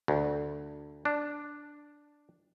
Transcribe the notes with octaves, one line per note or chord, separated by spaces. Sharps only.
D2
D4